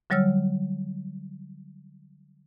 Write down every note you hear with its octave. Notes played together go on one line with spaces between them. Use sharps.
D3 F#3 G3 C#5 E6 F6